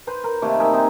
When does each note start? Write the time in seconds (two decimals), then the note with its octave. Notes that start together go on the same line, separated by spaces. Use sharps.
0.07 B4 C5
0.24 A#4
0.42 C3 D#3 A3 A#3
0.59 G#4 A#4 E5
0.73 C4 D#4